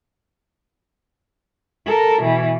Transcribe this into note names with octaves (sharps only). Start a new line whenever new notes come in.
A4 A#4
B2 E3